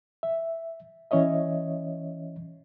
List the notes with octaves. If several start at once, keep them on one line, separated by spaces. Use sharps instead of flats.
E5
E3 C#4 C#5 D#5 E5